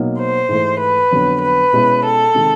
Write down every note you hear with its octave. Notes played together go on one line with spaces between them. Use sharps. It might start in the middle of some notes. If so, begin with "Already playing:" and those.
Already playing: B2 F#3 A#3 D#4
C5
G#2 E3 A3
B4
F2 D3 F#3 B3
B4
B2 G#3 C#4 E4
A4
C3 D#3 G#3